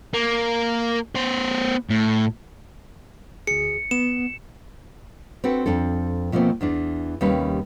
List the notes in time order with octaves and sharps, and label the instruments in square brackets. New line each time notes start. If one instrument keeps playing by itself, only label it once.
[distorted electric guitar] A#3
B3 C5
A2
[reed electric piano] D2 G#4 [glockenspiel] C#7
[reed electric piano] B3 [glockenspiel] E7
[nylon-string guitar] C4 D4 F#4 A4 B4
F2 C4 D4 A4
B2 F3 A3 A#3 C4
E2 E3 D4
D#2 C3 G3 C#4 B4 F5